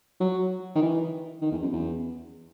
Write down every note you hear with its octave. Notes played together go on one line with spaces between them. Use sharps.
F#3
D#3
E3
D#3
E2
F#2
E2